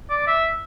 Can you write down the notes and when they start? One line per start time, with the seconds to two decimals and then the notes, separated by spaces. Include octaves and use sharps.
0.10 D5
0.27 E5